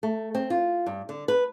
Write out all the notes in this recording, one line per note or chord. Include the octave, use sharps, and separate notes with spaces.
A3
C4
F4
G2
D3
B4